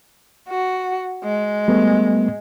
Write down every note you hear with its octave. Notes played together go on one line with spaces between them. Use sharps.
F#4
G#3
G3 A3 B3